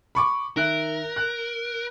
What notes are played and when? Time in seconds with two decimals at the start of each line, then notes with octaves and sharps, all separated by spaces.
0.15 B5 C#6 D6
0.56 D#3 A#4 E5 F#6
1.16 F#6